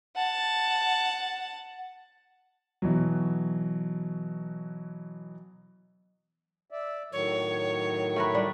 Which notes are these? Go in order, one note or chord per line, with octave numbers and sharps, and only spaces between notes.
F#5 A5
B2 E3 F#3
D5 E5
A2 D#3 F#3 C#5
A3 A#4 B4
G3 D4